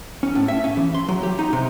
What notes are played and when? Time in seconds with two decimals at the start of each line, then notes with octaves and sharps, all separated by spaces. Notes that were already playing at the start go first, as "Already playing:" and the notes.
0.23 C#4
0.35 A2
0.48 E5
0.64 C#4
0.77 E3
0.94 C6
1.09 F#3
1.23 G4
1.39 D#4
1.53 C3